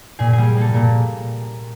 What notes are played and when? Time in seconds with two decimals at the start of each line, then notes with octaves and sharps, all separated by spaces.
0.19 A#2 G#4
0.33 G#4
0.38 G3
0.56 A#3 A4
0.74 A#2 A#4